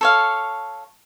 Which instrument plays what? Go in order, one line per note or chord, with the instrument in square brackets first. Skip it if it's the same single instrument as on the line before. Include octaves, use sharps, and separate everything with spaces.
[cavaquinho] A4 C#5 F5